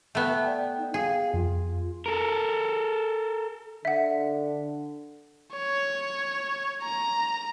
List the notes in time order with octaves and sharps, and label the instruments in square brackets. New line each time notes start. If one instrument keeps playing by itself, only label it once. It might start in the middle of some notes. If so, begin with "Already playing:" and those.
[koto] A3 B3 [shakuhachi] G5
[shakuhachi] D5 [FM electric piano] G5
[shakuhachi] D#4
[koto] G#4 [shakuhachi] F5
[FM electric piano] F2 [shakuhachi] F4
[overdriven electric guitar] A4 A#4
[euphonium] D3 [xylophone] E5 F#5
[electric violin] C#5
A#5